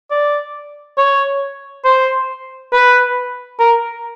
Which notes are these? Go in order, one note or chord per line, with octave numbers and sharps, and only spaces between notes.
D5
C#5
C5
B4
A#4